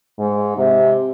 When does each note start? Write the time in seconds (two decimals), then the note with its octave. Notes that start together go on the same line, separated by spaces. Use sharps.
0.19 G#2
0.57 C3